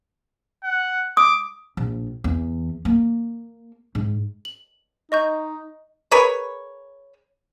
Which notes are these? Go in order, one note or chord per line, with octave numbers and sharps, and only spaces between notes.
F#5
D6 D#6
A#1
E2
A#3
G#2
F#7
D#4 D#5 C#6 G6
G#4 A#4 B4 C#5